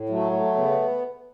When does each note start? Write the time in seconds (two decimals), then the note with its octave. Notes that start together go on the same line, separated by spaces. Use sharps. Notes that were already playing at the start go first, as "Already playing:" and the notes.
Already playing: A2
0.09 F#3 A3
0.32 A3
0.55 C#3 B3